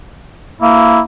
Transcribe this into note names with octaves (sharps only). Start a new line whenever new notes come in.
A#3 E4